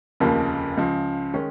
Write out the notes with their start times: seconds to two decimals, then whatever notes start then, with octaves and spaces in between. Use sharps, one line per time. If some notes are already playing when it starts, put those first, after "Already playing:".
0.20 F1 D#2 C#3 F3 A#3
0.77 C#2 C#3 F3
1.34 D#3 G#3 C#4